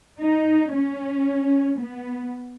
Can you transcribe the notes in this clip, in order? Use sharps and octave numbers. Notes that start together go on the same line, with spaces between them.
D#4
C#4
B3